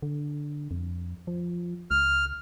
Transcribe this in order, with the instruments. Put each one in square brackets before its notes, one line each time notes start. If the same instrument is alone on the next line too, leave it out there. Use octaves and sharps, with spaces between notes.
[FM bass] D3
F2
F3
[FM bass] C#2 [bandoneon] F6